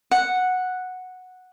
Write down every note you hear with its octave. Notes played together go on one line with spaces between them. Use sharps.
F#5